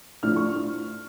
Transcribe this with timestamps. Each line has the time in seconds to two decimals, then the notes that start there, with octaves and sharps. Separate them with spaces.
0.22 A2 F3 A3 D4 F6
0.36 C#6